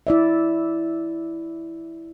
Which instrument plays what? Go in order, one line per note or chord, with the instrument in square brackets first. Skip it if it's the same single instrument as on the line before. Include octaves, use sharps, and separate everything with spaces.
[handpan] E4 D5 E5